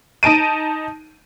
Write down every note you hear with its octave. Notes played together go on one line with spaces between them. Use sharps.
D#4 A5 D7 D#7